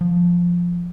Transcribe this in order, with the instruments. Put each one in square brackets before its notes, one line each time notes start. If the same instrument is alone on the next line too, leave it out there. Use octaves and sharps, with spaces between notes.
[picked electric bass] F3